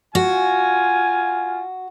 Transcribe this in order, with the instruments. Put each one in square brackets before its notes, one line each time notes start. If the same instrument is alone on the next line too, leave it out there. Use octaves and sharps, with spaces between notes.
[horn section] F4 G#5 [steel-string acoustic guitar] F#4